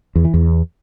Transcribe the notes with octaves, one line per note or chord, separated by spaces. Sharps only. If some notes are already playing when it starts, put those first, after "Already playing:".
E2
E3
E2